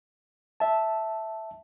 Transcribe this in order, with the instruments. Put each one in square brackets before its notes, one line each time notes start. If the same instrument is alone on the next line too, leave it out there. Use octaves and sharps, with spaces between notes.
[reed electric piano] E5 A5